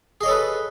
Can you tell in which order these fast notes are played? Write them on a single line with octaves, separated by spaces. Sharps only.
G#4 D#5 C#5 A4 B4